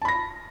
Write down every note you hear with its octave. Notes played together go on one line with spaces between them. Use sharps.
A5 B5 A#6